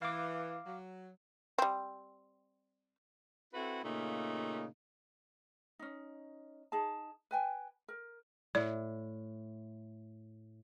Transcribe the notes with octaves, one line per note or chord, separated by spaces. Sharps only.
E3 F5 D6
F#3
G3 C4
C4 E4 F#4 A4 B4
A#2 C#3 A3 A#3 D#4
C#4 D#4
D#4 G#4 A5
B4 G5 G#5
A#4
A2 D5